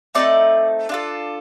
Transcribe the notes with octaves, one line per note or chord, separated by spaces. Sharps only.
A3 C4 D#4 A4 D5
D4 F4 A4